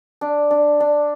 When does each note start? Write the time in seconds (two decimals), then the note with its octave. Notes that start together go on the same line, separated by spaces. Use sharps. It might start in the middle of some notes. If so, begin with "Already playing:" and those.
0.21 D4
0.51 D4
0.80 D4